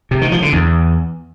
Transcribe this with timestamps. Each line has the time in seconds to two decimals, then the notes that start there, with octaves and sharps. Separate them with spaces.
0.11 C3
0.21 D#3
0.32 F3
0.42 D3
0.53 E2